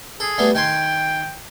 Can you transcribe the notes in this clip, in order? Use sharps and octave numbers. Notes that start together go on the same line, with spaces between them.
G#4 A4
G3 A3 B3
D#3 G5 G#5 C6